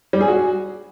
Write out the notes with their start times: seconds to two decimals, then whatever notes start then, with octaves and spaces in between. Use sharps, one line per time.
0.13 G3
0.21 G#4
0.28 F#4